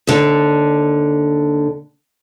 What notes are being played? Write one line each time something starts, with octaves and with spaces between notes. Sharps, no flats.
D#2 D3